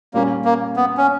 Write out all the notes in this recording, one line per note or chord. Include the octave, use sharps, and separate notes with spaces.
A#2 G3 A#3 C#4
A#3
B3
C#4